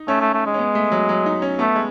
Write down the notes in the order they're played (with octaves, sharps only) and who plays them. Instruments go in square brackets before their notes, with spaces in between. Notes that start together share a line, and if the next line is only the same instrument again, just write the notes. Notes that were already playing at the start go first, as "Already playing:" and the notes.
Already playing: [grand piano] D#4
[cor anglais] A3 [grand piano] C#4
[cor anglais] A3
A3
G#3
[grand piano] C#4
B3
A3
F#3
F#3
D#4
C#4
[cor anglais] A3 [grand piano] B3
[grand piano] G#3